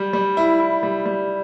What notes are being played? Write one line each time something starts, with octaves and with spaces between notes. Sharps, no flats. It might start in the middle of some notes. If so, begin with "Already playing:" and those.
Already playing: G3
G3
E4
E4
G3
G3